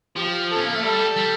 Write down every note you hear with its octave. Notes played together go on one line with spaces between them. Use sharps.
F3 G4
C#4 A4
A#3
A3
G3 A4
G3